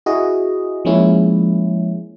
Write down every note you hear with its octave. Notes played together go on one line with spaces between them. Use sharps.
E4 F#4 G#4 D#5
F3 G#3 A#3 C#4 E4